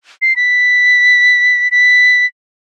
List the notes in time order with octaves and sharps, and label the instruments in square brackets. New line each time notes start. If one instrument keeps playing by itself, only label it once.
[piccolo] C7
B6
B6